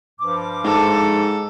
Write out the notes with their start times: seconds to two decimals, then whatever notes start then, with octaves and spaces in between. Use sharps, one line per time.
0.20 G2 F3 D6
0.64 G#2 A4